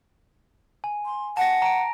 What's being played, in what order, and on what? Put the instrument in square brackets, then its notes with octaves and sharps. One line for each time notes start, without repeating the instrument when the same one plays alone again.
[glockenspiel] G#5
[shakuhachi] C6
[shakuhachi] F#5 [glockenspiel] A5 A#6
[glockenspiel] A#5 D7